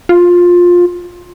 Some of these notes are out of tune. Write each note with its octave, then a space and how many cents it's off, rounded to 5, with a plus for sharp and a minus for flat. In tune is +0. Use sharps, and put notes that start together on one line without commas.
F4 +15